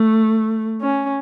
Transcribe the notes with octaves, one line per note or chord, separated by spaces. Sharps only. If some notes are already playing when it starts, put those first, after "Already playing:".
Already playing: A3
C#4